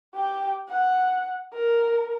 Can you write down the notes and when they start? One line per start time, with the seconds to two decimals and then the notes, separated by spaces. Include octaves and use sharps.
0.14 G4 G5
0.69 F#5
1.54 A#4